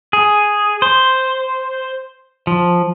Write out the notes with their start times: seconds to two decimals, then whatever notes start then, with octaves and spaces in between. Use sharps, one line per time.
0.13 G#4
0.82 C5
2.47 F3